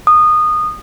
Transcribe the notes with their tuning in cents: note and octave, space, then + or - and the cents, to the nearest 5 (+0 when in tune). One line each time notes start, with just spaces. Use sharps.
D#6 -20